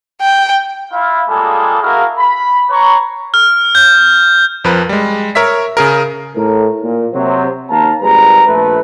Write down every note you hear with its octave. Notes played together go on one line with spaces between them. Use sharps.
G5
E4 F4 F5
G3 G#3 A#3 F4 G#4 A4
E4 F#4 G#4 A#4 F5
B5
B4 C#5 A#5 C6 C#6
F6
G6
F2 F3 A#4 B4
G3 G#3
A#4 C#5 E5 B6
C#3 G#4 A#4
A2 A#4
A#2
C3 F#3 C5
D#2 A#3 F5 A5 A#5
G#1 G3 G#4 B4 A#5
A#1 A3 B4